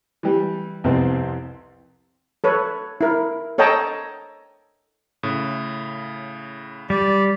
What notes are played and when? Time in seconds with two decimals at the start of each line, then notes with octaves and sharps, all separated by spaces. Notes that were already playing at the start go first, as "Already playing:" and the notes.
0.23 E3 G3
0.84 C2 F2 B3 C4
2.44 A4 B4 C#5
3.01 E4 A#4
3.58 A4 C#5 D#5 G5 A5 A#5
5.23 A2 C#3
6.90 G3 D5